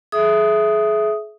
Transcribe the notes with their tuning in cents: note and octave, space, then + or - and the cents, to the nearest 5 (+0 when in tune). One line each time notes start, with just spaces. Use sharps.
G#4 +35 E5 +0 D#6 +0